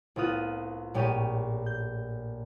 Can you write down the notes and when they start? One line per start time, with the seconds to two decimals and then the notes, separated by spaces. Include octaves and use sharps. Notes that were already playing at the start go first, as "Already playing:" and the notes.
0.16 C2 A2 B3 F4 D#6 F#6
0.94 A#1 A2 A3 G4 C#5 D#7
1.66 G6